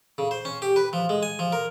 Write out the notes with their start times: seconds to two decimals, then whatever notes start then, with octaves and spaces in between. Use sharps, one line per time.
0.18 C#3
0.31 C5
0.45 C#4
0.62 G4
0.76 B4
0.93 F3
1.09 G#3
1.23 G#5
1.39 F3
1.52 A#4